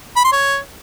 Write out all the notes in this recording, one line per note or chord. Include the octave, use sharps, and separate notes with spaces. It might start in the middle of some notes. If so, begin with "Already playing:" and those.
B5
C6
C#5